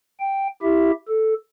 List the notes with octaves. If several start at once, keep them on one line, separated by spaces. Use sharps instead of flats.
G5
E4 G4 E5
A4